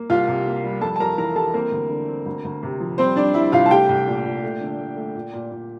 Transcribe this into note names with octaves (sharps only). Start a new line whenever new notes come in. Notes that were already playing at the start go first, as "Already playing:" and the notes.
Already playing: A#3
C2 F4 F5
C3
A#3
G3
F2 A4 A5
A5
F2 A#4 A#5
E3 A#4 A#5
E3 A4 A5
A#3 C4 A#4
D2
D3
C4
D2
D2
C3
F3
G3 C4 C5
G3 D4 D5
G3 E4 E5
C2 F4 F5
A5
A3 G4 G5
C2
A#2
A#2
A3
D3
A3
A3
A#2
A#2
A#2